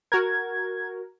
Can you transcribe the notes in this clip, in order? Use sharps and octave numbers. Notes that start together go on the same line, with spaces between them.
F#4 A#4 G#6